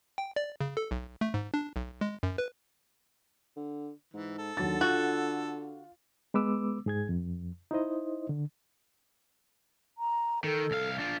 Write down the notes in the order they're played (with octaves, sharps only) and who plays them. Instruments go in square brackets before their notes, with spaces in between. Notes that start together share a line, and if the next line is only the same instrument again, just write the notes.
[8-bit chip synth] G5
D5
C#3
A4
B1
A3
G#2
D4
B1
G#3
F#2
B4
[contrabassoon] D3
[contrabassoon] G#2 [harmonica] E3
[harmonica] A4
[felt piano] D#2 F#3 A6 [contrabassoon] D3
[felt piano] F4 [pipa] F#4
[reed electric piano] G#3 B3 B4 D6 E6
G#2 G#4 G#6
F2
D#4 E4 C5 D#5
D3
[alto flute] A#5
[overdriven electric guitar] D#3 [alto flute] A4
[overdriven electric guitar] C2 F5
D4 F4